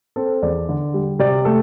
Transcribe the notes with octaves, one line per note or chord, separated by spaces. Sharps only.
C4 A4
E2 D5
D3
G3
C3 D5
A3 A4